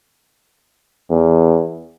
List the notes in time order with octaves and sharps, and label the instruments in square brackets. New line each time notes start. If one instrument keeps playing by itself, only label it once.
[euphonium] E2